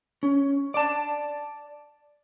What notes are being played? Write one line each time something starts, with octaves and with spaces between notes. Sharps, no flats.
C#4
D5 A5